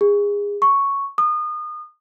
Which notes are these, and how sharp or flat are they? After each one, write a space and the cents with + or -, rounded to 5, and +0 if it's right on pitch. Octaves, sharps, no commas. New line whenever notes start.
G#4 -25
C#6 +0
D#6 -30